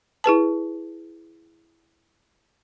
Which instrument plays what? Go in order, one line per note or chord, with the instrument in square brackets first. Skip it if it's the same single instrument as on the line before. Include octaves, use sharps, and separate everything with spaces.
[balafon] E4 G#4 B4 A5